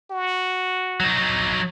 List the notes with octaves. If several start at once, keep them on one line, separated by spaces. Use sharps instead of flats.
F#4
F#3 D#4